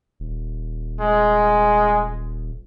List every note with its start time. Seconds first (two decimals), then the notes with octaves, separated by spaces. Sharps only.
0.20 D#1
1.01 G#3